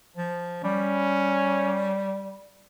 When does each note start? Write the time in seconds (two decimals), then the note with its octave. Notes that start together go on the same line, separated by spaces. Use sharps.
0.17 F3
0.64 G3 C#4